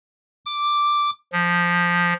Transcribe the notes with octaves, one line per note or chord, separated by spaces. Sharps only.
D6
F3